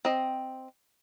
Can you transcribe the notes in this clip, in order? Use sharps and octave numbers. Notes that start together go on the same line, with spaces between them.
C4 D#5